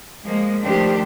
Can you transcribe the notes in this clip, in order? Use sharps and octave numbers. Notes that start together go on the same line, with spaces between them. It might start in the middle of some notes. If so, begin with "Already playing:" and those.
F3 G#3 A#3
D#3 F3 A3 D4 G4 C5